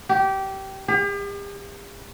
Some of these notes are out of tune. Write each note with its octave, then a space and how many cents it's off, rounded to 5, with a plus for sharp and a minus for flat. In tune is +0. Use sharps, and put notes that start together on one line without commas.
G4 -20
G4 +45